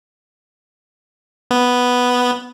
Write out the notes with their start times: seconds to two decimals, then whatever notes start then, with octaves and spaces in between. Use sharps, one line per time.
1.51 B3